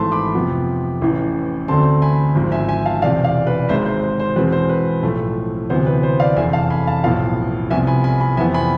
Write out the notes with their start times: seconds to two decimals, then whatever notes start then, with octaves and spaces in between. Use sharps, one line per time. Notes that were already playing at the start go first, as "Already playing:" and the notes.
Already playing: G#1 G#2 E3 A3 A5 C6
0.12 B5 D6
0.35 F2 C3 F3 B3
1.01 A1 A2 E3
1.68 D2 D3 A3 C4 A5 C6
2.02 G#5 B5
2.35 G#1 G#2 F3
2.52 E5 G#5
2.69 E5 G#5
2.86 F5 A5
3.02 E1 E2 C3 D5 F5
3.24 D5 F5
3.47 B4 D5
3.69 G#1 G#2 G#3 C5 E5
3.86 C5
4.03 C5
4.20 C5
4.36 E2 B2 G#3 C4 B4
4.52 C5
4.69 B4
5.03 B1 A2 F3 A3
5.70 D2 C3 E3 B3 C5
5.87 B4
6.03 C5
6.20 D5 F5
6.36 F1 E2 D3 E5 G#5
6.53 F5 A5
6.70 G#5 B5
6.87 F5 A5
7.04 B1 A2 F3 B3 F5 A5
7.70 C2 C3 F3 B3 E5 G#5
7.87 G#5 B5
8.04 G#5 B5
8.20 G#5 B5
8.37 F2 C3 E3 B3 E5 G#5
8.54 G#5 B5